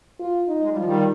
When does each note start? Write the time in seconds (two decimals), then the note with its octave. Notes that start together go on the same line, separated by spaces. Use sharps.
0.20 F4
0.48 D#4
0.62 G#3
0.70 G3
0.77 F3 F4
0.84 D#3 G3